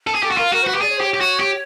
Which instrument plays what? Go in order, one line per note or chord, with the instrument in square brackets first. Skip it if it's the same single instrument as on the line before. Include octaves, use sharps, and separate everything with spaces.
[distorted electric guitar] A4
G#4
[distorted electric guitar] G4 [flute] A4
[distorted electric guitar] F#4
[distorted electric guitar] F4 [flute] A#4
[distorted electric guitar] F#4 [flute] A#4
[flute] C5
[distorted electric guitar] F#4 [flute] B4
[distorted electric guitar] G4
[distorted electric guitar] G#4 [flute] D5
[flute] C#5
C5
[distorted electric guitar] G4 [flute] C#5
[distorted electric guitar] G4
F#4
G4